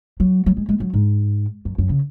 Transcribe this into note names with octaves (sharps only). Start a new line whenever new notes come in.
F#3
F#3
G#3
G#3
F#3
G#2
F#2
F#2
C#3